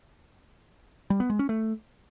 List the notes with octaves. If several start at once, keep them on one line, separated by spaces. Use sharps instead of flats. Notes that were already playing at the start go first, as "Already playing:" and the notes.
G3
B3
G#3
C#4
A3